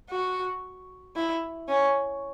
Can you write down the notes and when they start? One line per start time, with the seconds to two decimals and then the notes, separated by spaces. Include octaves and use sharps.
0.10 F#4
1.16 E4
1.69 C#4